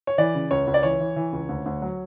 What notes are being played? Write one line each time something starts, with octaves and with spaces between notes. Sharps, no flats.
C#5
E3 D5
C#3
C#2 C#5
C#2
D5
E3 C#5
E3
E3
C#2
D2
D2
F#3